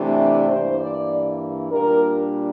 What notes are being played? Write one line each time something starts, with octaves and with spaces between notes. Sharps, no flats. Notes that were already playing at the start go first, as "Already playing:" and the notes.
Already playing: C3 E3 A3 D4
D5
G2 E3 A#3 C5
D5
A#2 G3 A#3 D4 A#4